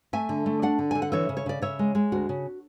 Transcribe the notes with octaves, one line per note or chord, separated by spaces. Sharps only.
A3 E5 G#5
D3
A3
D4 D5 F#5
D3
D3 G#5
F#5
E3 C#5 E5
C#3
C#5
C#3 D5
C#3 C#5 E5
G#3
G#3
D2 F#4
C#3